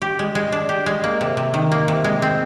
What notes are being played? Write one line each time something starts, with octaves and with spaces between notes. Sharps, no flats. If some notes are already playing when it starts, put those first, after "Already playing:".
G4
G#3
G#3
D4
G4
G#3
A#3
C3
C3
D#3
A#3
C3
G#3
C4